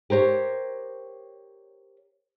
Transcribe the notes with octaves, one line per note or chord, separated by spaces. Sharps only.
G4 A#4 C5 C#5